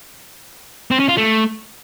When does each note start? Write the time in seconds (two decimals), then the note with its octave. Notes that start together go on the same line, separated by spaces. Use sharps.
0.91 C4
1.00 C#4
1.08 F4
1.17 A3